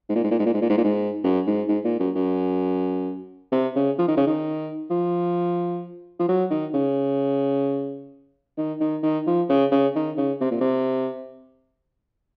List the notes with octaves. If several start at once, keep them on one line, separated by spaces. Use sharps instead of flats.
G#2
A#2
G#2
A#2
G#2
A#2
G#2
A#2
G#2
A#2
G#2
F#2
G#2
G#2
A#2
F#2
F#2
C3
C#3
F3
D#3
C#3
D#3
F3
F3
F#3
D#3
C#3
D#3
D#3
D#3
F3
C#3
C#3
D#3
C#3
C3
A#2
C3